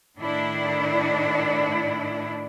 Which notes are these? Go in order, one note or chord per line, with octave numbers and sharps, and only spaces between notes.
A2 D#3 D4 E4